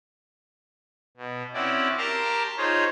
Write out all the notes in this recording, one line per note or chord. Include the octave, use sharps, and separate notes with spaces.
B2
C4 C#4 E4 F#4 D5
G4 A#4 A5 A#5 C6
D#4 F4 G#4 C5 C#5